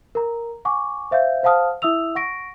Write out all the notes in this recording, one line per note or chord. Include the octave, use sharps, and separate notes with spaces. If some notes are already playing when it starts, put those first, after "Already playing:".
A#4 A#5
F#5 G#5 C#6 D6
C5 E5 F5 G6
C5 F5 F#5 A5 D#6 F6
E4 E5 D#6 E6 F7
F#5 C#6 A#6 D7